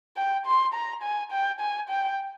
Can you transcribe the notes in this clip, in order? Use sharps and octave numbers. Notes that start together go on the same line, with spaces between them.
G5
C6
A#5
G#5
G5
G#5
G5